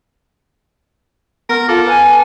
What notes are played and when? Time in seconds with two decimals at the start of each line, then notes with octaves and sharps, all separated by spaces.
1.49 B3 A#4 F6
1.69 F4 A4 D6
1.87 B4 G#5